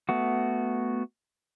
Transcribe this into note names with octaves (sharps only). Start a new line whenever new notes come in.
A3 B3 F#4